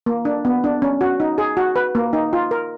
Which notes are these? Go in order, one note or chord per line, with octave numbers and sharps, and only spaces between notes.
A#3
D4
B3
D4
C#4
F#4
D#4
G#4
F#4
B4
A#3
D#4
F4
A#4